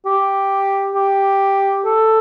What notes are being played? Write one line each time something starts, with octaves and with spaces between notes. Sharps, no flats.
G4
G4
A4